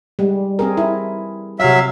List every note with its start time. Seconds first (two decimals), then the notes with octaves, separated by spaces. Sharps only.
0.19 G3 G#3
0.59 C4 G#4 A#4
0.77 E4
1.60 C3 F#3 E5 F5